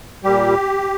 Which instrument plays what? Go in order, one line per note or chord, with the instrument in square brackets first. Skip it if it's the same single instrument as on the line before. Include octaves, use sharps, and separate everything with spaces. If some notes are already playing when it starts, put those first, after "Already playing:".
[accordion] A#2 G3 G4